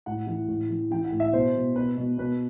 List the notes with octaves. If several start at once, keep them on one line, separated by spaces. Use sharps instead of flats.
A2 F#5
E3
A2
E3
E3 G5
F#5
A2
E5
B2 C5
B2
B2 B4
B2
B2 B4